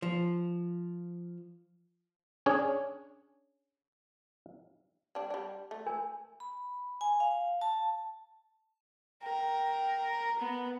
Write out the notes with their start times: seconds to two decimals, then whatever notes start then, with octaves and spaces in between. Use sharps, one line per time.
0.02 F3
2.46 C#4 D4 G#4 C#5
5.15 G3 D4
5.30 G3 D4
5.71 A3
5.86 A#4 G#5
6.40 B5
7.01 G#5
7.20 F5
7.61 A5
9.23 A#4 G5
10.39 B3